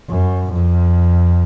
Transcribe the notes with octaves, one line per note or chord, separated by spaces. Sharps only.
F#2
F2